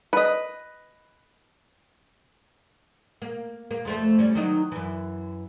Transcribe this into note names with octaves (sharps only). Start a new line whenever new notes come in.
B4 D#5
A#3
A#3
F2 A3 C5
G3 C#4
D#3 F#3 D#4
F#2 E3